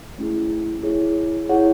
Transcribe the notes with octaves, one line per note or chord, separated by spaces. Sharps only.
A3 C#4 E4 G#4
E4 G#4 C#5
E4 G#4 C#5 F#5